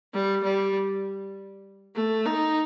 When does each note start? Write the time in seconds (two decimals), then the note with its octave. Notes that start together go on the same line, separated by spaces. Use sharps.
0.13 G3
0.43 G3
1.95 A3
2.26 D#4